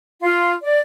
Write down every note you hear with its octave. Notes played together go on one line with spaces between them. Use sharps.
F4
D5